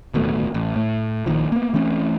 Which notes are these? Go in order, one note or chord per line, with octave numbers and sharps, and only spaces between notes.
D1 D#2 B2 A3
A1
A2
A#1 A#2 D#3 F3
A#3 B3
E3 A3 C4 C#4